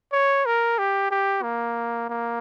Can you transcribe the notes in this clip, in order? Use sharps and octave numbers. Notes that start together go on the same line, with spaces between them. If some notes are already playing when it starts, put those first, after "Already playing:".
C#5
A#4
G4
G4
A#3
A#3